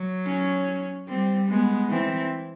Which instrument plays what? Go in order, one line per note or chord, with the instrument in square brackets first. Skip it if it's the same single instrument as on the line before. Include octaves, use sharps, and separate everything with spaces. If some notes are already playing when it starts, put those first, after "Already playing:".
Already playing: [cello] F#3
[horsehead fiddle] C#4
[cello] G3 [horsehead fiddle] C4
[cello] G#3 [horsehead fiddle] B3
[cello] E3 [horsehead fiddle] C4